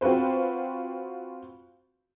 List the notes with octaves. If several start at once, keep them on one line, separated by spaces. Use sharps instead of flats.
C4 F4 F#4 B4 C5